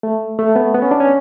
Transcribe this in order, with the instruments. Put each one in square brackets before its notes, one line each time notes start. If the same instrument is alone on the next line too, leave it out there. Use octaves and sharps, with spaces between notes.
[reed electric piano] A3
A3
B3
B3
C#4
D4
C#4